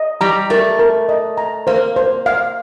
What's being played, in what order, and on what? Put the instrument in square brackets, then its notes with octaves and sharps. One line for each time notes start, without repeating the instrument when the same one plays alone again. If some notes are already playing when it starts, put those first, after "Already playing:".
Already playing: [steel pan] D#5
[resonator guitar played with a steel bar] G3 [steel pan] A#5
[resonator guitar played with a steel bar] A3 [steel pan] A#4
[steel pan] A#4
D#5
A#5
[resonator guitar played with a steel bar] A#3 [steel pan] C5
[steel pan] C5
F5